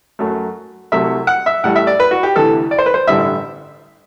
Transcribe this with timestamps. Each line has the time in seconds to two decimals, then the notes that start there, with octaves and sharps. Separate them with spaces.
0.19 F#2 F#3 A3
0.92 C2 C3 F#3 A3 E5
1.27 F#5
1.46 E5
1.63 A1 A2 G3 F#5
1.76 E5
1.87 D5
2.00 B4
2.11 F#4
2.23 G4
2.36 D2 C3 E3 A4
2.71 D5
2.79 C5
2.86 B4
2.94 C5
3.07 A1 G2 D3 G3 E5